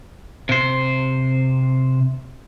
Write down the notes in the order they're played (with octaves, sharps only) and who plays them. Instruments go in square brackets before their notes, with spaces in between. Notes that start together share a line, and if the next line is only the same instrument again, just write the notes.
[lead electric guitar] C3 C5